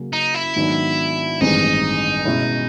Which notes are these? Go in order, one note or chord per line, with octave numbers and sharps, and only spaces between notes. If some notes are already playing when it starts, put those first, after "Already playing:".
Already playing: C#3 F#3 A#3 C#4
D#4
E4
G#2 D#3 F#3 B3 D4
A1 G2 D#3 G#3 C4 D#4
B2 G#3 C#4 E4